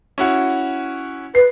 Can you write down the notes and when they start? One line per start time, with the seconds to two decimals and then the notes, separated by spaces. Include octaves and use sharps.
0.18 C#4 E4 F#4
1.35 B4 C7